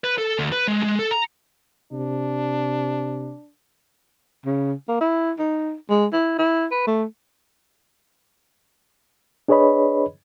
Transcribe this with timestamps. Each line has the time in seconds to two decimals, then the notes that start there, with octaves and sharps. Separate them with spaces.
0.04 B4
0.18 A4
0.39 D2
0.52 B4
0.67 G#3
0.83 G#3
0.99 A4
1.11 A#5
1.92 C3 D4
4.46 C#3
4.88 A#3
5.00 E4
5.39 D#4
5.90 G#3
6.13 E4
6.38 E4
6.71 B4
6.87 A3
9.48 D4 G#4 B4 C#5 D#5 B5